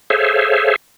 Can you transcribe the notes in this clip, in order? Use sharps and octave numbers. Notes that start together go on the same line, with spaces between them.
G#4 A4 C5 C#5 E5 F5